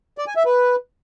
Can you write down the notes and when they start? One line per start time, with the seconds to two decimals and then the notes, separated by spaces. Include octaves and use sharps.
0.18 D5
0.27 G#5
0.36 E5
0.46 B4